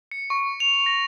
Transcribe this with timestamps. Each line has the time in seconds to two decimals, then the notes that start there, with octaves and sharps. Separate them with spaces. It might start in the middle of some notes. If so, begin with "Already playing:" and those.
0.11 C#7
0.30 C#6
0.60 F7
0.86 A#6